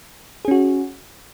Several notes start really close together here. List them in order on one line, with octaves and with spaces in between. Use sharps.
G#4 C#4 F#4